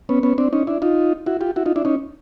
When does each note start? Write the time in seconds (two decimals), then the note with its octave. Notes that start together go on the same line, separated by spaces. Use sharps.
0.09 B3 C#4
0.23 B3 C#4
0.38 C4 D4
0.53 C#4 D#4
0.67 D4 E4
0.82 D#4 F4
1.26 E4 F#4
1.41 F4 G4
1.56 E4 F#4
1.66 D#4 F4
1.76 D4 E4
1.85 C#4 D#4